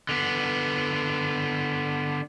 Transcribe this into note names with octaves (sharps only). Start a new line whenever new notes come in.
D3 B3